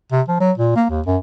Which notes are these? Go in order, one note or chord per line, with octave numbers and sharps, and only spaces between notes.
C3
F3
F#3
A#2
A#3
D#2
F#2